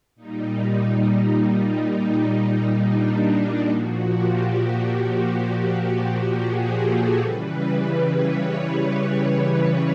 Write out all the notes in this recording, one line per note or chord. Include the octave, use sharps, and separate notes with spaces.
A#2 G3 D#4
D#4
D4
D#4
A#2 F3 F#4
G4
G#4
A4
C#3 E3 G3 B4
C#5